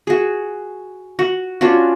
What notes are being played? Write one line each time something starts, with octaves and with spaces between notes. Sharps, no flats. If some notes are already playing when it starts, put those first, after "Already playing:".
F#4 G#4
F#4 F#5
C#4 D4 F4 F#4